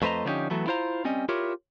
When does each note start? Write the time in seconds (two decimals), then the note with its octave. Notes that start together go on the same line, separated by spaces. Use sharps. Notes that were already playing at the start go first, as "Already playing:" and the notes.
0.02 F2 A3 B4 C5 D#5 A#5
0.25 D3 F3 B3 C#4 D#4 G4
0.50 E3 F#3 A3 B3
0.67 E4 F4 C5 F5 A#5
1.05 G3 C4 C#4 D#5
1.29 E4 F4 G4 A#4 C#5